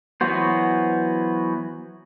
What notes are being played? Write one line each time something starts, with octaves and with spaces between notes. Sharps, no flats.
E3 F#3 B3 F#4 C5